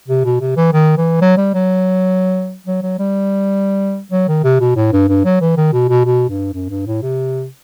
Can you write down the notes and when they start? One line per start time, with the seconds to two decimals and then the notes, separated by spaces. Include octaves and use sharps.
0.08 C3
0.25 B2
0.41 C3
0.57 E3
0.73 D#3
0.97 E3
1.21 F#3
1.37 G3
1.54 F#3
2.66 F#3
2.83 F#3
2.99 G3
4.12 F#3
4.28 D#3
4.44 C3
4.60 B2
4.76 A2
4.93 G2
5.08 G2
5.25 F#3
5.41 E3
5.57 D#3
5.73 B2
5.89 B2
6.05 B2
6.29 G2
6.54 F#2
6.70 G2
6.87 A2
7.02 C3